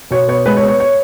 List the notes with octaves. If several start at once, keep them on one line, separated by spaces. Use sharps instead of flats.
B2 C#5
B3 C#5
G#3 B4
C#5
B3
C#5
C#5